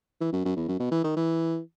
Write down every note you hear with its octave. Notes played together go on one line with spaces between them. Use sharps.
E3
F#2
F#2
E2
F#2
B2
E3
D#3
E3